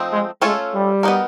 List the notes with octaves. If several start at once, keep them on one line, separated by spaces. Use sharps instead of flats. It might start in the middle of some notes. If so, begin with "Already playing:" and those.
Already playing: F3 A3 C4 D#4
G#3
G#3 A3 C#4 F4 A4 C#5
G3
B3 D#4 F#4 A#4